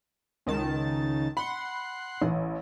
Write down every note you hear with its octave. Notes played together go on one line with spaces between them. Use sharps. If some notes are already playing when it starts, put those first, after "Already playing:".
C#2 D#3 A5
F#5 B5 C6
A1